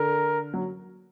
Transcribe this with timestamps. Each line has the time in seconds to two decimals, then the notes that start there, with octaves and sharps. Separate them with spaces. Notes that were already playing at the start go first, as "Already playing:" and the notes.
Already playing: D3 A#4
0.54 F#3